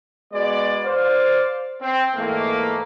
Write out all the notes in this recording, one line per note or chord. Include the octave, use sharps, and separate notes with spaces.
G#3 B3 F#4 D5
C5 D5 F5
C4
G#2 E3 A3 A#3